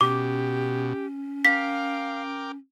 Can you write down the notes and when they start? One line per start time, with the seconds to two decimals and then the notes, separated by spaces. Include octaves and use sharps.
0.01 B2 C#4 G4 D6
1.45 A#4 F5 G5 D6 B6